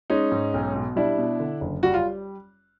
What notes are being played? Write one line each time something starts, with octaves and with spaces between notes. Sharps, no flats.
G#3 C#4 D#4
G#2
B1
B2
G3 D4 E4
B2
D3
F#1
G3 F#4
F4